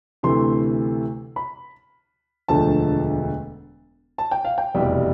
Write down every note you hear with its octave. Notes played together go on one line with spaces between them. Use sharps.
D2 C3 E3 A3 C6
B5
E1 D2 D3 F3 A3 A5
A5
G5
F5
G5
F1 E2 B2 G3